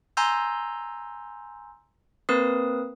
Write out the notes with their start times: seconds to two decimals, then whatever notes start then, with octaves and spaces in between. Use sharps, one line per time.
0.17 G#5 A#5 C6 E6 G6
2.29 A#3 C4 A#4 B4 D#6